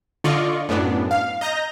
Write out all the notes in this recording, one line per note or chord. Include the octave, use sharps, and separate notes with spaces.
D3 F4 D5 D#5 C#6
F#2 A2 B3 D4
F5
D#5 A#5 G6 A#6